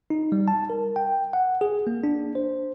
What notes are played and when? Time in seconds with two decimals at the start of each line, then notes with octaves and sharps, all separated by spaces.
0.10 D#4
0.32 G3
0.48 A5
0.70 A#4
0.96 G5
1.33 F#5
1.61 G#4
1.87 A#3
2.04 D4
2.35 C5